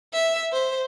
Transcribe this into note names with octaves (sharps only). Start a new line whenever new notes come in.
E5
C5